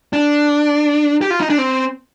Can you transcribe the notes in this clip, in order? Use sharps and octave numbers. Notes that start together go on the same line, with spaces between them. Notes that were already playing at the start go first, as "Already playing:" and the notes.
D4
G4
F4
D#4
D4
C4